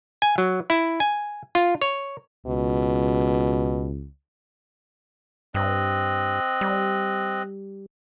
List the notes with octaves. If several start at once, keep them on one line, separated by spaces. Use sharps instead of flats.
G#5
F#3
E4
G#5
F4
C#5
C#2 B2
G2 C4 D#5 F#6
G3